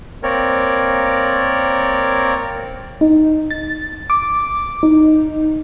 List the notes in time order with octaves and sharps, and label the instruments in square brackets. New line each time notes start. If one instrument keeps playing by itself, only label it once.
[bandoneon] A#3 C4 A#4 C#5 D5
[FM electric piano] D#4
A6
D6
D#4